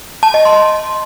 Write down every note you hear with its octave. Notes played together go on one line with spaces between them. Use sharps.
A5
D#5
C6